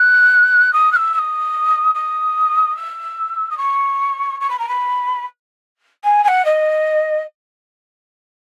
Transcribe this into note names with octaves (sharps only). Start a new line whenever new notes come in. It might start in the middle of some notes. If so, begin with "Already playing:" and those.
Already playing: F#6
D#6
F#6
E6
E6
D#6
D#6
E6
D#6
C#6
C#6
B5
A#5
B5
G#5
G#5
F#5
D#5